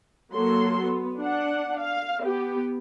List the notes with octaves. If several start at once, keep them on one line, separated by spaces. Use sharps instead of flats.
F#3 A#3 A4 C6
B3
D4 F#5
F5
B3 G4